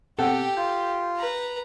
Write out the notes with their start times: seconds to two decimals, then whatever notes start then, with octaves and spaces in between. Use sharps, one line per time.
0.19 B2 C4 G4 A4 F#5 G5
0.57 F4 G6
1.16 B4 A#5